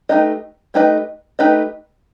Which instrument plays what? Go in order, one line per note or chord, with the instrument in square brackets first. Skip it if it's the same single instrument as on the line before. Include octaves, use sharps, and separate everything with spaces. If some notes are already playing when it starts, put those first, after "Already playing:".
[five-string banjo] A3 D#4 G4 B4 D#5
A3 D#4 G4 B4 D#5
A3 D#4 G4 B4 D#5